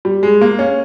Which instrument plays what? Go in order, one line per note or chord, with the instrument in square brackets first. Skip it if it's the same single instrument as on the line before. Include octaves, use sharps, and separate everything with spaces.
[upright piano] G3
G#3
A#3
C#4